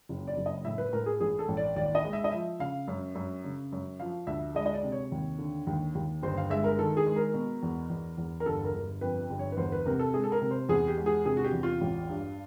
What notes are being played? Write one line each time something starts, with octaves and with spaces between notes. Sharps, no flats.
F#1
D5
F#1
D#5
A2 E5
B4
A2 A#4
G#4
A1 G#4
A4
A1
D5
D#2 D5
D#5
G#3
E5
D#5
F3 E5
C#3 F5
F#2
F#2
C#3
F#2
F3 F5
D2 E5
G#3 D#5
D#5
D5
C3
C#5
D#2
D3
D#2
D#2
G1 C5
F5
G#3 E5
A#4
D#3 A4
G#4
G#3
A#4
B2
E2
E2
E2
A#4
G1 A4
A#4
G1
F2 B4
G1
C#5
B4
E2 C5
B4
C3 A#4
A4
G#3 G#4
A4
A#4
C3
C5
E2 G#4
G4
G#3
G#4
C3 G#4
F#4
G4
E2
F4
A1
G2